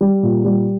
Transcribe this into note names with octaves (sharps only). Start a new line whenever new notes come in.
G3
A#2
G3